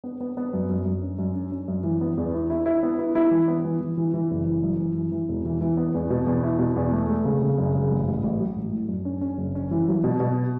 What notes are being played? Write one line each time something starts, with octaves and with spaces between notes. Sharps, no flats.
B3
B3
B3
F#2
F#2
F#2
C#4
F#2
C#4
C#4
F#2
E3
B3
E2
E4
E4
E4
B3
E4
E4
E3
B3
E3
E3
E3
E3
F#1
E3
F#2
E3
E3
E3
E1
E3
E3
B3
E2
B2
E2
E4
B2
E2
A3
A3
C#3
C#3
F#1
C#3
A1
A1
A1
F#3
A1
A2
F#2
C#4
C#4
F#1
C#4
E3
F#3
B2
B2